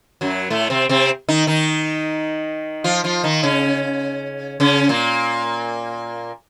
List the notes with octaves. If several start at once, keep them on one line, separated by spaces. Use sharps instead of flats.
F#2 F#3
A2 A3
C3 C4
C3 C4
D#3 D#4
D#3 D#4
F3 F4
F3 F4
D#3 D#4
C#3 C#4
C#3 C#4
A#2 A#3